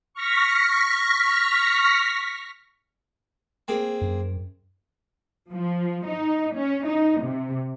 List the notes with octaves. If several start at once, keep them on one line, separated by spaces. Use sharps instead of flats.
C#6 F6 A#6 B6
A#3 C4 G#4
F#2
F3
D#4
C#4
D#4
C3